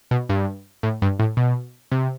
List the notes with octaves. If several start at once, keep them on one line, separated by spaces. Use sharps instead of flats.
B2
G2
A2
G2
A2
B2
C3